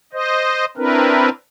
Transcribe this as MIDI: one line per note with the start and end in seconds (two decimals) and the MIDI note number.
0.13 0.65 72
0.13 0.65 75
0.77 1.29 60
0.77 1.29 62
0.77 1.29 64
0.77 1.29 70
0.77 1.29 71